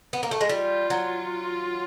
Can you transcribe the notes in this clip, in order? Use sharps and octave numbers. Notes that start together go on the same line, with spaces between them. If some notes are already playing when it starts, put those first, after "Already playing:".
B3
A#3
A3
G#3
G3 F4
F#3